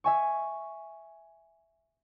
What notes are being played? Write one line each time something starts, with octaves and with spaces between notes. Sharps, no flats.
E5 G#5 C#6